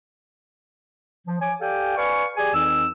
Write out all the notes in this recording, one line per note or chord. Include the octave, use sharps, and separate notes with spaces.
F3
C#5 G#5 D6
G4 A4 D5 F5 G5 G#5
B4 D5 F5 G#5 C#6
G4 G#4 D5 G#5
F2 E3 D#4 E6